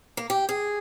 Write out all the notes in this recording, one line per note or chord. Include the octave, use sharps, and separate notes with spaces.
A#3
G4
G#4